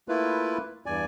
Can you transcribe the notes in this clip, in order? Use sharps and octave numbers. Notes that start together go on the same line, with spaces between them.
A3 A#3 E4 F4 B4
E2 G2 D5 G#5